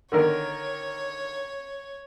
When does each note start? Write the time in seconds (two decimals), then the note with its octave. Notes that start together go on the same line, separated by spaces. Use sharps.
0.12 D3 D#3 A#4 C#5